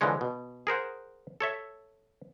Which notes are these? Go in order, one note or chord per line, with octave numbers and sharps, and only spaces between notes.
D3 E3 F3 G#3 C#5
B2
G#4 A#4 C5 F#5
A4 C#5 E5